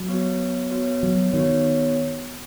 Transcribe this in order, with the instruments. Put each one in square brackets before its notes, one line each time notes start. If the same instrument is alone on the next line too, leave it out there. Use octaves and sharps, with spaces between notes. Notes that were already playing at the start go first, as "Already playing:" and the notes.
Already playing: [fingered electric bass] F#3
[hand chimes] B3 F#4 C#5
B3 F#4 C#5
[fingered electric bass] F#3
[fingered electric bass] D#3 [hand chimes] B3 F#4 C#5